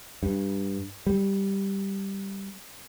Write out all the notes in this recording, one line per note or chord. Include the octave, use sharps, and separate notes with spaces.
G2
G3